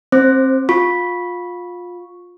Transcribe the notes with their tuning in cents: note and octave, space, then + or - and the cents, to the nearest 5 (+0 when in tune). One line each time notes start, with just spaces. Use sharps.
C4 +25 C5 +0
F4 +25 C#6 +0